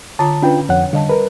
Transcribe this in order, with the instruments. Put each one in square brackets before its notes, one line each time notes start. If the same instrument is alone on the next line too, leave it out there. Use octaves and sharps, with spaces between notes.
[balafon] D3 F4 A#5 [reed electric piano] A5
[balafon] C#4 B4 [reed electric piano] D4 F4 G5
[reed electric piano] F2 F#5 [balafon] C#5
[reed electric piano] D3 [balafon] G3 D#5 A5
[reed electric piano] A#4 B4